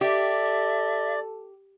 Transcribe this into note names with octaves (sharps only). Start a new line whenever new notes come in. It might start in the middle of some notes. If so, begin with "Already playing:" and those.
G4 A4 D5 E5